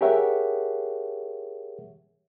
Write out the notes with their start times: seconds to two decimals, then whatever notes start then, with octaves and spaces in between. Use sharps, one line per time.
0.01 G4 G#4 A#4 C#5 E5 F#5